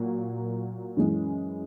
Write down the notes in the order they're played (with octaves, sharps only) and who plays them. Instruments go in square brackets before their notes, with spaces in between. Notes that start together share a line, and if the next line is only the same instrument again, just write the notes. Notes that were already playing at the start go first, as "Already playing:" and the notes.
Already playing: [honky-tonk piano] A#2 F#3 A#3
F#2 E3 G#3